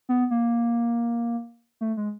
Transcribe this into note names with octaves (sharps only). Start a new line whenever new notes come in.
B3
A#3
A3
G#3